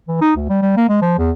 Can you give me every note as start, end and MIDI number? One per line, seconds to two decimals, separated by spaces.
0.08 0.17 52
0.21 0.31 63
0.36 0.47 38
0.49 0.59 55
0.62 0.72 55
0.77 0.86 58
0.89 0.98 56
1.02 1.16 53
1.18 1.31 40